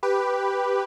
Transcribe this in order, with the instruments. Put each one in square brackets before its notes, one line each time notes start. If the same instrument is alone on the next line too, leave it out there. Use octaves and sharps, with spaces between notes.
[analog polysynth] G4 B4